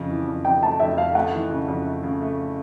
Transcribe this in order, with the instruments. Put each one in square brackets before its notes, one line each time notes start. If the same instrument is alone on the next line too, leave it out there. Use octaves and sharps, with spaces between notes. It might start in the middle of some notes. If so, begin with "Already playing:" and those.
Already playing: [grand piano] F2 C#3
E3
F2
[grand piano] F2 [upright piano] G5
[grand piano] A3 [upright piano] A5
[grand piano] F2 [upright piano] E5
[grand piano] A3 [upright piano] F5
[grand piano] A3 [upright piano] F#5
[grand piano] E3
C#3
F2
A3
C#3
A3